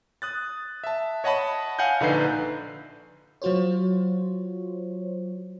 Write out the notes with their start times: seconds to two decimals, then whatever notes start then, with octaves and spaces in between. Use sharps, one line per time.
0.22 D#6 F#6 A6
0.84 E5 A5
1.24 C#5 D#5 F#5 A5 B5
1.79 F5 F#5 G#5 F#6 G6
2.00 A#1 D3 D#4 B4 G6 C7
3.42 F#3 F4 F#4 C5 C#5